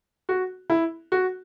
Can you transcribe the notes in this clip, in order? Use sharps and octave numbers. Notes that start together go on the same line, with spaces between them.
F#4
E4
F#4